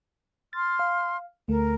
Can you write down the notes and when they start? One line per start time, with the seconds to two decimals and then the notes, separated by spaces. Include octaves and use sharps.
0.53 C6 F6 A6
0.79 F5
1.48 D2 A3 A#4